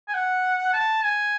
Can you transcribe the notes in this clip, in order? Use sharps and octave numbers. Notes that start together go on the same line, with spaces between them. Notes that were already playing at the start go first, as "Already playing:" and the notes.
G#5
F#5
A5
G#5